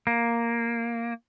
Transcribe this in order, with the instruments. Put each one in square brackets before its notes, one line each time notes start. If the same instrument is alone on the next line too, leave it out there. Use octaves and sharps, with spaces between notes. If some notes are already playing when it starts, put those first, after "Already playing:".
[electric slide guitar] A#3